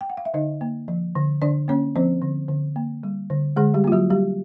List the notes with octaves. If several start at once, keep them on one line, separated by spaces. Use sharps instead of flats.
G5
F#5
F5
E5
D3 D#4 D#5
A#3
F3
D3
D3 D4 D5
A#3 C#4 C#5
F3 C4 C5
D3
D3
A#3
G3
D3
D3 G#3 G#4
G3 G4
A#3 F4
F#3 F#4
G3 G4